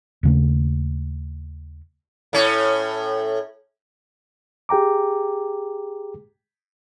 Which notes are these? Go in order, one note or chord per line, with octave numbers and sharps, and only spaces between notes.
D#2 C#3 A3
A2 C#4
G4 G#4 G5 A#5 D6